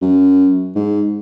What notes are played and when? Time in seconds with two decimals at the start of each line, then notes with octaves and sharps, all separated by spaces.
0.02 F#2
0.75 G#2